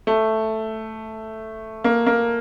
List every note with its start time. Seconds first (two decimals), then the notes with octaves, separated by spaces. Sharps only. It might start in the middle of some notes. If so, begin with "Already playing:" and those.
0.07 A3
1.84 A#3
2.06 A#3